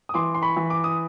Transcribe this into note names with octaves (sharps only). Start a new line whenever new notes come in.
D#6
E3 C6 D6
C6
B5 C#6
E3
D6
D#6